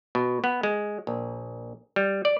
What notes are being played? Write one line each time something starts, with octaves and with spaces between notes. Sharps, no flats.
B2
B3
G#3
A#1
G3
D5